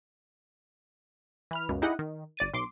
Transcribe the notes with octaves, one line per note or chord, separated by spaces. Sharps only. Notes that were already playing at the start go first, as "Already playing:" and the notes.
E3 B5 F6
C#2 F#2 B2
D#4 E4 G4 G#4 D#5 F#5
D#3
G1 D5 A6 D#7
B1 C6 D6